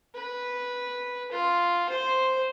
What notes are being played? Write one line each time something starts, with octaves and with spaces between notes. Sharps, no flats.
B4
F4
C5